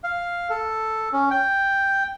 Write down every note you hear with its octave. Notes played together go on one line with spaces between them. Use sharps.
F5
A4
C#4
G5